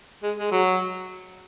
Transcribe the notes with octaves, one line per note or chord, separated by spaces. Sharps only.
G#3
G#3
F#3